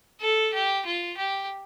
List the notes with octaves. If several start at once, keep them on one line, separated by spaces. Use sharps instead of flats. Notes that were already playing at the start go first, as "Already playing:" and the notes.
A4
G4
F4
G4